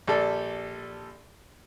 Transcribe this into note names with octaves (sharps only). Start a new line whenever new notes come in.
A#1 G3 A4 D5